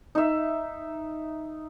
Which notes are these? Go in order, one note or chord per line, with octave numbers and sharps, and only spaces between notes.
D#4 E5